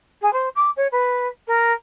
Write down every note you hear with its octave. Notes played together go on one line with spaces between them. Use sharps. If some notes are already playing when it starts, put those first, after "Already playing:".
G#4
C5
D6
C#5
B4
A#4